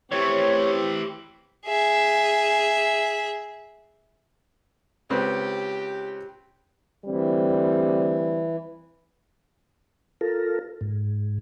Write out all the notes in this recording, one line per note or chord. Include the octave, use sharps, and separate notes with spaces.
E3 A3 C4 G4 C#5
G#4 E5
C#2 C4 G4 B4
D2 E3 G3 C4
F4 A4 A#4
G#2